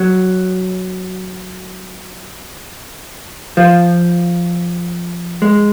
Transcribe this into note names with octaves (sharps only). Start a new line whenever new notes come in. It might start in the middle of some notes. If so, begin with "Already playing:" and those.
Already playing: F#3
F3
G#3